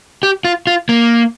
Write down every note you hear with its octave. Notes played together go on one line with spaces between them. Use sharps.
G4
F4
F4
A#3